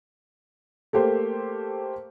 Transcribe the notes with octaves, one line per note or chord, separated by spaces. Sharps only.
A3 A#3 G4 C5